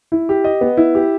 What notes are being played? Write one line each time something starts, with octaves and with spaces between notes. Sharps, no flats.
E4
G4
D#5
B3
E4
G4